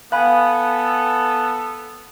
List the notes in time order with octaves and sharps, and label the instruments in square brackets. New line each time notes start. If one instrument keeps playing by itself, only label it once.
[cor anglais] B3 [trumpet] A4 [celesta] F5 [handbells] G#5 B5 F#6